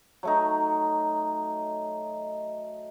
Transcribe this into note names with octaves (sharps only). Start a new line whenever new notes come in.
F#3 A3 D#4